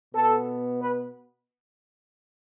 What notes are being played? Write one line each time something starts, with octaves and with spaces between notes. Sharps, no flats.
B2 B3 A4
B4